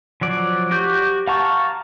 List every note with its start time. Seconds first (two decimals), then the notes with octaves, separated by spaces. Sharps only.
0.21 F3 F#3 D5
0.71 F#4 G4 D6 G6
1.27 F5 F#5 A5 A#5 C#6